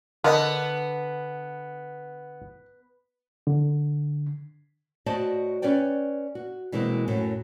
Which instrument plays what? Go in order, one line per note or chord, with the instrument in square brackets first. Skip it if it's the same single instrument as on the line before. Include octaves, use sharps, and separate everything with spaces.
[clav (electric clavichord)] D3 [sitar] B3 [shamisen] A#4 D5 D#5
[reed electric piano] D3
[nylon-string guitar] A2 F#4 C5 D5 D#5 A5
C#4 B4 C#5 D5 G5
F#4
B2 E3 G#3 A#3 C4
F#2 A2 F#3